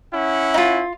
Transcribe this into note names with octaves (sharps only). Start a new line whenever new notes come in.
C#4 E4 F#5
D#4 F4